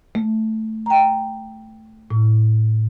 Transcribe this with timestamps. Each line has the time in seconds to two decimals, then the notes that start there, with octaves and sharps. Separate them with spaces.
0.15 A3
0.86 G5 A#5
2.11 A2